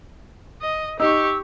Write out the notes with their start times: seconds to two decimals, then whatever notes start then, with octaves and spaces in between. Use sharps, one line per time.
0.61 D#5
1.00 D#4 G4 C#6 E6